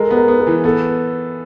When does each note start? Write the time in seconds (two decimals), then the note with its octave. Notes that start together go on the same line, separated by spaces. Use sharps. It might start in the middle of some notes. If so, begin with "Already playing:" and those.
Already playing: G#3 A4 A#4
0.11 B3
0.17 A#4
0.28 B3
0.40 A#4
0.47 E3
0.64 B3 A4